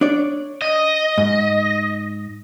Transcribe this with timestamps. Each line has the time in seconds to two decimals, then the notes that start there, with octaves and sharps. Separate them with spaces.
0.01 D4 C#5 D5
0.62 D#5
1.18 G#2